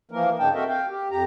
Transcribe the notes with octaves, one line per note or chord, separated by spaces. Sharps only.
E3 F3 A#3 A#4
G2 C#3 D4 D#4 G5 A5
C4 F#4 A4 A#4 D#5 E5
F5 G5
G4
F2 G4 A#5